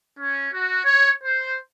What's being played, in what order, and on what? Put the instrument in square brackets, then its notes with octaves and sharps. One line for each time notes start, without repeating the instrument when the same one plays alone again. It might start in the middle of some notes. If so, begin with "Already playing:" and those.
[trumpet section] C#4
F#4
C#5
C5